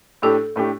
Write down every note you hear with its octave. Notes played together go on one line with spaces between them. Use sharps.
A2 A3 D4 G4 A4
A2 A3 D4 G4